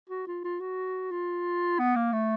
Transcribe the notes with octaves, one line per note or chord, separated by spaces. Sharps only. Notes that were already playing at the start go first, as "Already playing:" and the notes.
F#4
F4
F4
F#4
F4
B3
A#3
A3